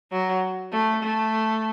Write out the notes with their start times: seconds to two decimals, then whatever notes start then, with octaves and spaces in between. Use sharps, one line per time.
0.12 F#3
0.73 A3
1.03 A3